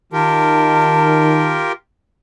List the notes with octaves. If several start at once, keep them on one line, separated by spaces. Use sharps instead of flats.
D#3 F4 G4 A#4 A5